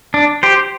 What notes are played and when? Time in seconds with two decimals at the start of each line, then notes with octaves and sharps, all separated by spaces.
0.14 D4
0.43 G4 C5